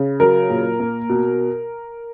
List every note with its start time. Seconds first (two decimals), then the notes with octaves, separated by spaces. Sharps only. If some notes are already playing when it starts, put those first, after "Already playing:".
Already playing: C#3
0.20 F#3 A#4
0.50 A#2
0.80 A#3
1.09 B2